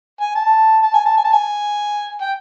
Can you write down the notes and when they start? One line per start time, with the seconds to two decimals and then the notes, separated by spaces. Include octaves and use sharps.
0.21 G#5
0.36 A5
0.83 A5
0.94 G#5
1.06 A5
1.17 G#5
1.25 A5
1.33 G#5
2.22 G5